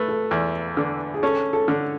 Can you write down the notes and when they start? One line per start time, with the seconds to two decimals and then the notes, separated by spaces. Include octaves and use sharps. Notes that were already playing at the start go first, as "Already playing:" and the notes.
Already playing: A3 B4
0.09 A4
0.31 E2
0.77 D3
1.14 G#4
1.23 C#4 A4
1.53 A4
1.68 D3